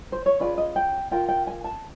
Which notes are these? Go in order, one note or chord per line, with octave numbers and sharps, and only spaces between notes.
C5
C#5
C#4 F4 G#4 B4 D5
D#5
G5
F4 A#4 G5
G5
G#5
A5